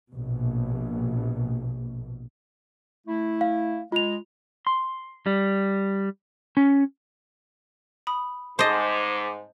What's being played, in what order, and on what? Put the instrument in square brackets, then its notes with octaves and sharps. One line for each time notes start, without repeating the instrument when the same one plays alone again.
[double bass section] A#1 B2
[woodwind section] A3 E4
[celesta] F5
[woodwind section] G#3 [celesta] F4 F7
[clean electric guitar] C6
G3
C#4
[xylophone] B5 D#6
[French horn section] G#2 [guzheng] C5 D#5 [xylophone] A5 D#6 A6 [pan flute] D6